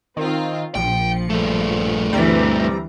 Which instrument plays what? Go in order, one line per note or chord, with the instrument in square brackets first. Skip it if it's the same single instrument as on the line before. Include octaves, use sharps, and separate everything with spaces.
[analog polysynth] D#3 [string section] C4 F4
[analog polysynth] A#1 C#7 [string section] F3 [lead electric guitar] G5
[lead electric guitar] G2 A3
[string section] D2 E3 [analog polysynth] G3 C4 A#5